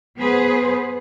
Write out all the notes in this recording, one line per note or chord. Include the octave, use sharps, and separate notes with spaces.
B3 G#4 B4 C5